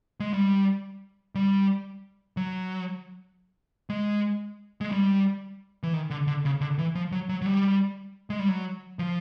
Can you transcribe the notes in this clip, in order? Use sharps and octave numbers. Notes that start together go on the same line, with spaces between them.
G#3
G3
G3
F#3
G#3
G#3
G3
E3
D#3
D3
D3
C#3
D3
E3
F3
F#3
F#3
F#3
G3
G#3
G3
F#3
F3